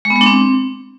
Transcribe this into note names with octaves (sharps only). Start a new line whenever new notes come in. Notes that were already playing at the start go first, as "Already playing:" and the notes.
G#3
B3
G#3
D4
C4